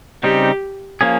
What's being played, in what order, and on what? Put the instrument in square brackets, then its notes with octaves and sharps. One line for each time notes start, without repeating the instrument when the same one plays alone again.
[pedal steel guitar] C#3 G3 C4 D#4 [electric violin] G4
[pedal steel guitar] F3 A#3 C#4 G#4